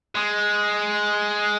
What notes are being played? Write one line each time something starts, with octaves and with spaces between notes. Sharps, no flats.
G#3